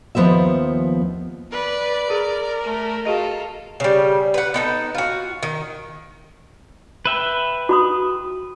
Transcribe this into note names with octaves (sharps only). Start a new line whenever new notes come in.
D#2 F3 B3 C5 E5
B4 D5
G#4 A#4
A3
F4 F#4 G#4 A4 D#5
C#3 G3
B4 F#5
B3 D#4 A4
F4 F#4
D#3
B4 E5 G5
F#4 B5 D#6